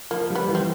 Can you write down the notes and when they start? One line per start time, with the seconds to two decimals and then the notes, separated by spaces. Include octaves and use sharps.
0.11 F3 A#3
0.30 G3
0.35 B3
0.49 E3
0.55 C4